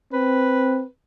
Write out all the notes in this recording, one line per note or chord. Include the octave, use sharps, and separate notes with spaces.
C4 B4